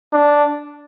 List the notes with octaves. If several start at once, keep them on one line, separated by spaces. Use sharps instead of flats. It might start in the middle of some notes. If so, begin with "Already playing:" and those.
D4